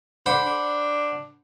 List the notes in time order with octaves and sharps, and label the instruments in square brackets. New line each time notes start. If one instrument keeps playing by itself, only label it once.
[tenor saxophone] D4 [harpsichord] C5 F#5 B5
[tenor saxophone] D4